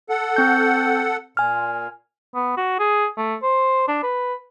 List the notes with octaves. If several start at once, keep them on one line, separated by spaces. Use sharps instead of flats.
A4 F#5
C4 G6
A#2 G#5 F6
B3
F#4
G#4
A3
C5
D4
B4